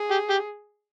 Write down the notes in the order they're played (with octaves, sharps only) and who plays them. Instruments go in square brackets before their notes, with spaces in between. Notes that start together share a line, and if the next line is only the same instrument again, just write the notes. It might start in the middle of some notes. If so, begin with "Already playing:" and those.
Already playing: [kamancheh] G#4
[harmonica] G4
G4